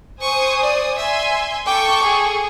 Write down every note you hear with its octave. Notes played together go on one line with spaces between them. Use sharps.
C5 G#5 C#6 D#6
D5
E5 G#5 C6
A4 G5 C#6 D6
G#4